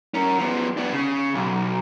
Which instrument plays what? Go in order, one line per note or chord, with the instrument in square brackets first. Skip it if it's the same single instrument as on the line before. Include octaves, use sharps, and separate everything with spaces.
[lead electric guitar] C#4 A#4
F3 B3
B3 D4
C#3
B1